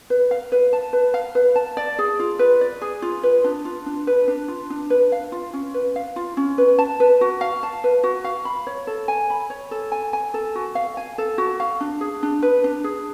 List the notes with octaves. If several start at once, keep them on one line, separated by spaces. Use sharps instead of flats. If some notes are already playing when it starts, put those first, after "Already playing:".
B4
F5
B4
A5
B4
F5
B4
A5
D5
G#4
F4
B4
D5
G#4
F4
B4
D4
F4
D4
B4
D4
F4
D4
B4
F5
F4
C#4
B4
F5
F4
C#4
B4
A5
B4
F#4
F5
A5
B4
F#4
F5
B5
C#5
A4
G#5
B5
C#5
A4
G#5
G#5
A4
F#4
F5
G#5
A4
F#4
F5
D4
G#4
D4
B4
D4
G#4